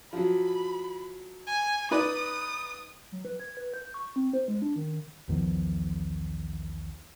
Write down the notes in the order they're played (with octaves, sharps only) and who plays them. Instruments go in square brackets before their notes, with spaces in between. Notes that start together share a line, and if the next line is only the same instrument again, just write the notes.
[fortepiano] F3 F#3 [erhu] B5
[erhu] G#5
[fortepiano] D#4 B4 D5 [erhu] D#6
[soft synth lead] F#3
B4
G#6
B4
G6
C#6
C4
C5
G#3
D4
D#3
[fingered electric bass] B1 E2 D#3 F3